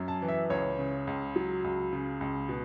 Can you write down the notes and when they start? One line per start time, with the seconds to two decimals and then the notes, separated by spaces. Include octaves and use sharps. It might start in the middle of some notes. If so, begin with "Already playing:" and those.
Already playing: F#2 C#4
0.08 A5
0.22 E3
0.28 E5
0.50 C#2 C#5
0.79 C#3
1.07 C#2
1.36 F#3
1.64 C#2
1.93 C#3
2.21 C#2
2.49 B2